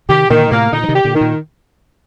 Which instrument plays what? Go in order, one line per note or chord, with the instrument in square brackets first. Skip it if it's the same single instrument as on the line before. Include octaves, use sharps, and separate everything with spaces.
[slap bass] C3 D#3 [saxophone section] G4
[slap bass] A#2 D3 [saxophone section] D#3
[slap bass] A2 C3 [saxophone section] A#3
[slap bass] A#2 D3 [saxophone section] D#4
[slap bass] F3
C3 D#3
[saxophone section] G4
[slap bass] A#2 D3
[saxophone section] D#3
[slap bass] A#2